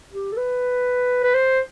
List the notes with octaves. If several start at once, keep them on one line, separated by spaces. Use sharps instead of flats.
G4
A4
B4
B4
C5